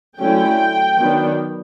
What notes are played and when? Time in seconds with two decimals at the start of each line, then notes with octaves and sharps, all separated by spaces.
0.18 D3 F#3 A3 C#4 E4 G5
0.97 D#3 F#3 B3 D4